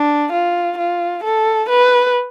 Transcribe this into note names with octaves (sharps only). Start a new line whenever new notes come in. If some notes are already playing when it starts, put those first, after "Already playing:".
Already playing: D4
F4
F4
A4
B4